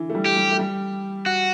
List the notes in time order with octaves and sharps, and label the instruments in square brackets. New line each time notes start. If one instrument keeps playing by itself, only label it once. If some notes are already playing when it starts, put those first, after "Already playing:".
Already playing: [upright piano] D3 E3
A3
G3
[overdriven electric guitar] G4
[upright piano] G3
A3
G3
[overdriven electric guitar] F#4